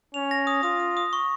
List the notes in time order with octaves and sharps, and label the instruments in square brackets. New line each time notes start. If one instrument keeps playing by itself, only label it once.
[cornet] C#4 [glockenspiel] F7
[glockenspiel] A#6
D#6
[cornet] F4 [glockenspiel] D#6
[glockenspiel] D#6
D#6
C#6